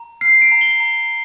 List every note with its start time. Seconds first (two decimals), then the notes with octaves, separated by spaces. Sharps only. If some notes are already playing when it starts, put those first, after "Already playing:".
Already playing: A#5
0.21 F6 C7
0.42 D7
0.52 A#5
0.61 G7
0.80 A#5